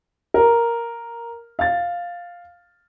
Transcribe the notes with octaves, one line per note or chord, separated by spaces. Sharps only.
A#4
F5 A6